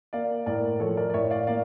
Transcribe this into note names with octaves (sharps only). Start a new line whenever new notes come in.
A#3 D5 F5
A2 A#4 D5
F3 A4 C#5
A#4 D5
D5
A2 C#5 E5
D5 F5
A#3 D5 F5